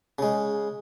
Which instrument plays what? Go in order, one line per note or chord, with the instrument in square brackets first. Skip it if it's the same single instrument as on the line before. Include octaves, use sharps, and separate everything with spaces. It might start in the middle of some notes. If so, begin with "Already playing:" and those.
[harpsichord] C#3 G#3